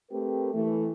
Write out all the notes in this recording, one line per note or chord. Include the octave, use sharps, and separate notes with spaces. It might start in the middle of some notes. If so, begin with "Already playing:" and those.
A3 C4 G4 A#4 B4
E3 A3